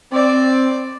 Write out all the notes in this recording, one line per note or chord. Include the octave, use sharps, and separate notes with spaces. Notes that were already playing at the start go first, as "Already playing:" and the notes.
C4 D5